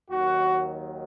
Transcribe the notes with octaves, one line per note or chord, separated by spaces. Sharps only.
D#2 D#3 F#3 F#4